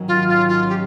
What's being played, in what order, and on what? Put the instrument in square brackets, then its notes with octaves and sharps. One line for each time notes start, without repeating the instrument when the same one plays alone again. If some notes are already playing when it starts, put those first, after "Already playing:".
Already playing: [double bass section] G#2 D#3 F#3 C#4
[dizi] F4
F4
F4
G4